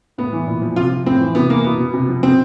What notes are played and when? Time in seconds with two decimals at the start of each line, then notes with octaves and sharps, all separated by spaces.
0.18 A2 B3
0.33 E3
0.47 A#2
0.62 F3
0.76 C3 F4
0.92 F3
1.06 A2 C4
1.21 E3
1.35 C3 B3
1.50 E3 A#3
1.64 B2 B3
1.79 B2
1.94 C3
2.09 F3
2.23 B2 C4